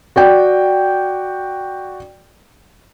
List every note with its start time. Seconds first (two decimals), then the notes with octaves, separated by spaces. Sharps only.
0.16 F#4 D5 G5